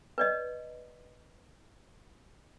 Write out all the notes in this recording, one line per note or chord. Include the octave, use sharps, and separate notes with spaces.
B4 D5 D#5